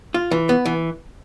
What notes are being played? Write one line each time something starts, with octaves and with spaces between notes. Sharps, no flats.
F4
E3
B3
E3